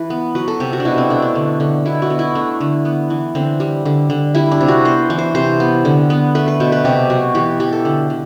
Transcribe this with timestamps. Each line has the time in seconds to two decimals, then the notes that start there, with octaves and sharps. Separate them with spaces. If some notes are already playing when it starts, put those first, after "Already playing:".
Already playing: E3 B4
0.10 B3
0.35 F#3 B4
0.48 A4
0.60 C3 G4
0.73 F#4
0.80 D4
0.85 B2 E4
0.98 C4
1.10 A3 D4
1.22 D4
1.35 D3
1.60 D3
1.85 B2 E4
2.02 F#4
2.10 B3
2.19 E4
2.35 A3 D4
2.60 D3
2.85 B3
3.10 E3
3.35 D3 C4
3.60 G3
3.85 D3
4.10 D3
4.35 G3 E4
4.51 D4
4.61 C3
4.68 F#4
4.85 B3 C5
5.10 E3
5.18 C5
5.35 C3 C5
5.60 B3
5.85 D3
6.10 B3
6.35 A3 B4
6.48 B4
6.60 B2 C5
6.72 B4
6.85 C3 G4
7.10 F#3 F#4
7.35 E3 G4
7.60 E3 G4
7.72 A4
7.85 D3
8.10 D3